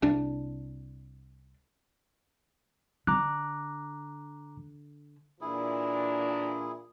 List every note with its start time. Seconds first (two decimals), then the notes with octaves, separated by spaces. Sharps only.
0.02 C2 D4
3.07 D3 A#5 D6 F#6
5.41 A#2 E3 A#3 D4 E4 G#4